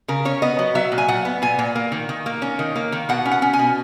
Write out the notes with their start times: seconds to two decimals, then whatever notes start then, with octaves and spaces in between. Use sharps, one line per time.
0.08 C#3 A#4
0.25 C#4 C#5
0.42 B3 D#5
0.59 F#3
0.75 F#3 E5
0.92 A#2
0.98 G#5
1.08 A#2 F#5
1.25 B3
1.42 A#2 G#5
1.59 A#2
1.75 A#3
1.92 D#3
2.09 D#3
2.26 A#3
2.42 C#4
2.59 D#3
2.76 A#3
2.92 D#3
3.09 B2 F#5
3.25 C#4
3.31 F#5
3.42 C#4
3.53 G#5
3.59 B2